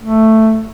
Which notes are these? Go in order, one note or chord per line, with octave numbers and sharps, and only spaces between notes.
A3